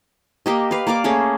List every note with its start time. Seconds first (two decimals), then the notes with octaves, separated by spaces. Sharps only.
0.46 A#3 G4 D#5
0.71 B4 F5
0.87 A#3 D5 F5 D6
1.04 A3 A#3 C#4 G#4